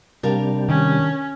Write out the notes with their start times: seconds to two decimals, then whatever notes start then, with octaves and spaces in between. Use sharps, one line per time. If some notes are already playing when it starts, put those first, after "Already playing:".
0.23 C3 G3 D4 A#4 F5
0.69 D#3 C#4